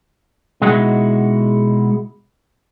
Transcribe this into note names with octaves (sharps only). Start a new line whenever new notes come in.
B2 G#3 D#4 E4 F#4